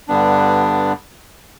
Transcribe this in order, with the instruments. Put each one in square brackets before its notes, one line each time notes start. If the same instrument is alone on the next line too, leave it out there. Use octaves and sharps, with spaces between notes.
[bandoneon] G2 D3 G3 B3 D4